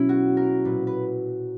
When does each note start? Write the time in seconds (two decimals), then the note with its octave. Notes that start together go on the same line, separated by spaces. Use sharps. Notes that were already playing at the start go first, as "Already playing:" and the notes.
Already playing: B2 F#3 C#4 E4
0.09 F#4
0.37 A#4
0.65 A#2 F#3 B4
0.87 B4